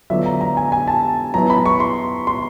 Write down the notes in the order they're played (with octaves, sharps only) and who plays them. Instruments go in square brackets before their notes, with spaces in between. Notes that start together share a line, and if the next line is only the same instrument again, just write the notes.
[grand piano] D3 F#3 B3 D4 F4 E5
A#5
A#5
G#5
G#5
A5
F#3 B3 E4 A#5
B5
C#6
C6
C6